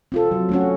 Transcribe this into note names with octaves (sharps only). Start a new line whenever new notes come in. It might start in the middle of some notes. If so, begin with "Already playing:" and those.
C4 F4 A4
F#3
A3 C#4 F#4